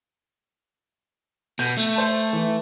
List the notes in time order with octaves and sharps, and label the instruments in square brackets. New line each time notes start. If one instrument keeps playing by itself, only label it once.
[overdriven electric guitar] B2 [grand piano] G6 D#7
[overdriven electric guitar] A3
[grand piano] C5 A5
E3